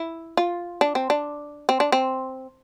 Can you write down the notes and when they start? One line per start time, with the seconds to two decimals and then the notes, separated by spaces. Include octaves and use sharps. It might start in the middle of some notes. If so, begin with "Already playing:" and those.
Already playing: E4
0.37 F4
0.81 D4
0.95 C4
1.10 D4
1.69 C4
1.80 D4
1.92 C4